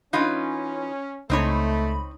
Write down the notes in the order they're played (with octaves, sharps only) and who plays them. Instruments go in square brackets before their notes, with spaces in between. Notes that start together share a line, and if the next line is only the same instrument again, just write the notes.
[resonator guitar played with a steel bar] E3 D#4 F4 [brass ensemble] C#4
[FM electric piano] C#2 B5 [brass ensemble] A3 [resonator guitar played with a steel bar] C4 D#4 C#5